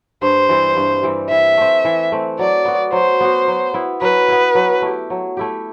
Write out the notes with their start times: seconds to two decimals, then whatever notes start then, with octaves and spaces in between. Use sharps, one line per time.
0.22 G2 C5
0.49 E3 G3 C4
0.76 G2
1.03 E3 G3 C4
1.30 E3 E5
1.57 A3 C4
1.85 E3
2.12 A3 C4
2.39 F#3 D5
2.65 B3 F#4
2.92 F#3 C5
3.20 B3 F#4
3.48 F#3
3.74 B3 E4
4.01 F#3 B4
4.28 B3 E4
4.55 F#3
4.82 A3 E4 G4
5.10 F#3
5.37 A3 E4 G4